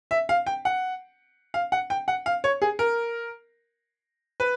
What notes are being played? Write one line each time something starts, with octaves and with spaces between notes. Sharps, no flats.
E5
F5
G5
F#5
F5
F#5
G5
F#5
F5
C#5
G#4
A#4
B4